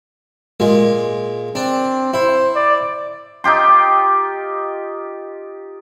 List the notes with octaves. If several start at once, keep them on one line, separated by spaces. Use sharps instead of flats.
A#2 G#3
C4 D4
E4 C5
D5
D#4 F4 G4 C6